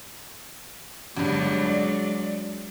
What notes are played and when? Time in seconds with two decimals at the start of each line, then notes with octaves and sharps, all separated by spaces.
1.17 G1 G2 F#3 G#3 D4
1.66 D5